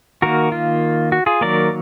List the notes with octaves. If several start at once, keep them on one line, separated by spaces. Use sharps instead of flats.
D#3 A#3 F#4 A#4
F4
F#4
F4 G#4
D#3 F#3 A#3 A#4 D5